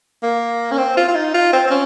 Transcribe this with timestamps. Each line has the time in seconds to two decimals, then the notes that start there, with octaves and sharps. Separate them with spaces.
0.23 A#3
0.71 C#4
0.78 C4
0.97 F4
1.08 F4
1.15 D#4
1.34 F4
1.53 C4
1.67 C4
1.71 C#4